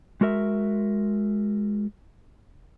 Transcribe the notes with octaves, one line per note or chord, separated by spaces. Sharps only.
G#3 F#4 A#4 E5